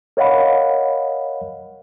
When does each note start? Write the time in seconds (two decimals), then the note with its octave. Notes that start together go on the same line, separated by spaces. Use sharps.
0.17 A#4 C#5 D#5 F5 F#5 B5